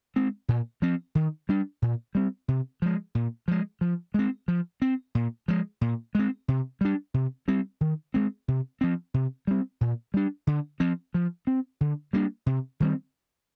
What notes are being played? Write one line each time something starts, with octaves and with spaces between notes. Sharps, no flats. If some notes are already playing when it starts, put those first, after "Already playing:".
G#3 C4
A#2
F3 C4
D#3
G3 D4
A#2
G3 C4
C3
F3 G#3
A#2
F3 G#3
F3
G#3 C4
F3
C4
A#2
F3 G#3
A#2
G#3 C4
C3
G3 D4
C3
G3 C4
D#3
G#3 C4
C3
F3 C4
C3
G3 C4
A#2
G3 D4
D3
F3 C4
F3
C4
D3
G3 A#3 D4
C3
D#3 G3 C4